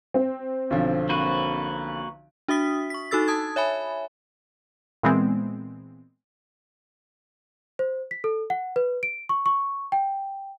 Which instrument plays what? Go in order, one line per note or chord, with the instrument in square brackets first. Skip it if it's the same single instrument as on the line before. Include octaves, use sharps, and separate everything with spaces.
[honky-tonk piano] C4
[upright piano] B1 D3 F3
[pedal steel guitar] A#3 F#4 B4
[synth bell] D4 F#4 E5 D#6 B6
C#6 B6
D#4 F#4 A4 E6 A6
A5 D#6 G#6
C#5 E5 G#5 B5
[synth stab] A#2 E3 G#3 B3 C4
[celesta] C5
B6
A4
F#5
B4
D7
C#6
C#6
G5